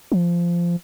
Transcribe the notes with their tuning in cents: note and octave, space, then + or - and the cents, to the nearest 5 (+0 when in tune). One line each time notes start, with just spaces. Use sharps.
F3 -15